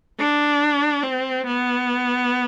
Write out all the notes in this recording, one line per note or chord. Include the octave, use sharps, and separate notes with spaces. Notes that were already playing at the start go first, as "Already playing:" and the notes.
D4
C4
B3